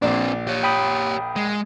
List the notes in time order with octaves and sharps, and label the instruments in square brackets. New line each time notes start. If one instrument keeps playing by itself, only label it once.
[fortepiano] A#1 D5 [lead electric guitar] C4 D4
[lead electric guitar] G4 C#5
[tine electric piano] G5 B5 D#6
[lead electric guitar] G#3